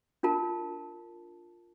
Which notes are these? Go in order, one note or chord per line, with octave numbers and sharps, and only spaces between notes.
D4 F4 A#4 A5